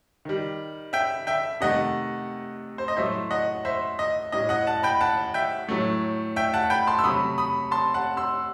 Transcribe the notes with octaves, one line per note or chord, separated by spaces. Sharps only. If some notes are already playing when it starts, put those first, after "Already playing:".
D#3 G3
E5 G5
E5 G5
C3 D#3 A3 D#5 F#5
C5
D#5
A2 F#3 A3 C5 E5
D#5 F#5
C5 E5
D#5
A2 G3 D#5
D#5 F#5
F#5 A5
G5 B5
F#5 A5
E5 G5
A2 F#3 A3
E5 G5
F#5 A5
G5 B5
A5 C6
E6
C3 F#3 A3 B5 D#6
B5 D#6
A5 C6
F#5 A5
C6 E6